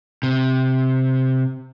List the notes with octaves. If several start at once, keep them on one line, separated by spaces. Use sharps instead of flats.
C3